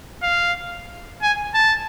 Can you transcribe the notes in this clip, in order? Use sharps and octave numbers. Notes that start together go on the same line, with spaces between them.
F5
G#5
A5